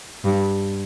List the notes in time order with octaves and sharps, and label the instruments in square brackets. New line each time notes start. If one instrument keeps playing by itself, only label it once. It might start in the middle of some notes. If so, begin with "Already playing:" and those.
[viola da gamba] G2